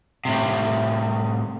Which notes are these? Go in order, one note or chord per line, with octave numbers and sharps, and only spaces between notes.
A2 C3